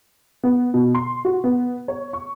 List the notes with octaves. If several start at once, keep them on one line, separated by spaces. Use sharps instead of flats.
B3
B2
C6
F#4
B3
C#5
C#6